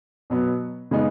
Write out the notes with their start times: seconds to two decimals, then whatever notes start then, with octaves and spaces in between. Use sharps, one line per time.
0.30 B2 F#3 B3
0.91 C#3 G#3 B3 D#4